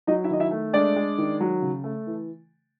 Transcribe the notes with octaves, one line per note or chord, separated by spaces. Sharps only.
F#3 D#4 D#5
E4 E5
D#3 D#5
E4 E5
A3
G#3 D4 D5
G#3
D#3
F#3
C#3
A3
E3